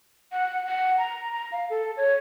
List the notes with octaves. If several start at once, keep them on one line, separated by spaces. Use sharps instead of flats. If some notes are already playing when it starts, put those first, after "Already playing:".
F#5
F#5
A#5
A#5
F5
A4
C#5